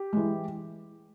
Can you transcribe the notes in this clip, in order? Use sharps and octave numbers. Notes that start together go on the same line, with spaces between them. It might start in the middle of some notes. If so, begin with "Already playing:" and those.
Already playing: G4
E3 G#3